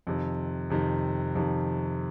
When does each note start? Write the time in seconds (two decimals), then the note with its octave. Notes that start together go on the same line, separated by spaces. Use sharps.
0.07 F2 C3 D#3
0.70 F2 C3 D#3
1.35 F2 C3 D#3